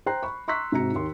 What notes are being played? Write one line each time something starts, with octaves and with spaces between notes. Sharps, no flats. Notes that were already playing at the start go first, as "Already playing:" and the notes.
C5 G5 A#5 F#6 C7
B5 C#6
A#5 C6 C#6 E6 F#6 B6
G#2 C3 F#4 A#5 C#7
D#2 C6